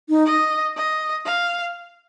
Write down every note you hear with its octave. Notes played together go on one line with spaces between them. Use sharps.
D#4
D#5
D#5
F5